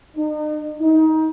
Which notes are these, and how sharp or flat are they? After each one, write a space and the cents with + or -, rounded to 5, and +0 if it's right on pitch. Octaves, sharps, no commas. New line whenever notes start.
D#4 -40
D#4 +25